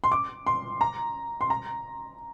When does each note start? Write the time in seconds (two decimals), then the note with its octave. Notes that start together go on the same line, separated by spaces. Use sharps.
0.04 C6
0.12 D6
0.46 C6
0.81 A#5
1.41 C6
1.50 A#5